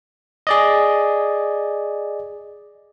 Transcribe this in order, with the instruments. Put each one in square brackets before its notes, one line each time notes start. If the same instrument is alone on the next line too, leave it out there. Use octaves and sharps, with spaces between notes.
[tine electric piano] G#4 D5 D#5